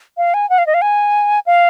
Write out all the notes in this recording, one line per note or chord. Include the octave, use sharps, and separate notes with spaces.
F5
G#5
F#5
F5
D#5
F5
G#5
F5